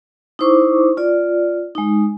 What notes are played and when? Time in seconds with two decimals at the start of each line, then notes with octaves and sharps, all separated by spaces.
0.39 D#4 E4 C5 C#6 D6
0.97 F4 D5
1.75 G#3 D#4